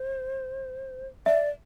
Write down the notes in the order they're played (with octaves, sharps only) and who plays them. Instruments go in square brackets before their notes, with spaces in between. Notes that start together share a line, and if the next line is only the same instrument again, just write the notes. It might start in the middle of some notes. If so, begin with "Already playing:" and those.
Already playing: [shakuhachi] C5
[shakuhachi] D5 [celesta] E5